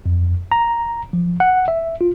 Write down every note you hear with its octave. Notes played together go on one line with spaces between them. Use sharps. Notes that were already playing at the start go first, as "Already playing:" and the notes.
F2
A#5
F3
F#5
E5
F4